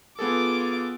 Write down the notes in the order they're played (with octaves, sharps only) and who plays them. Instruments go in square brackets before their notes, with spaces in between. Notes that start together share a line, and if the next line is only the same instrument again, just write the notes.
[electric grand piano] B3 G#4 A4 [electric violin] F4 D6